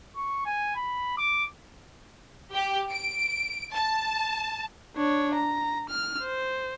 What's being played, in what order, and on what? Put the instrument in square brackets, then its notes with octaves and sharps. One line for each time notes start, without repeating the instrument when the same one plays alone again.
[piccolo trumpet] C#6
G#5
B5
D6
[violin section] G4
D7
A5
[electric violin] D4 C#5
A#5
F6
C5